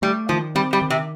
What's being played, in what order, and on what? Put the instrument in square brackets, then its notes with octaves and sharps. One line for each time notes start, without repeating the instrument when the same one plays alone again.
[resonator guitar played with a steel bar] G3 [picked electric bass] A3
[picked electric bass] D#3 [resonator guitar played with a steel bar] F3
[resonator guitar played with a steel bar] G3 [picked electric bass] C4
[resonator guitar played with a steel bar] G3
[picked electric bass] D#3
[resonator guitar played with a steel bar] C3